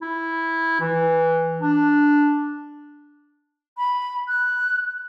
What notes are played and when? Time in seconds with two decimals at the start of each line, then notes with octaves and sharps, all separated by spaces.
0.02 E4
0.81 E3
1.62 D4
3.77 B5
4.28 F#6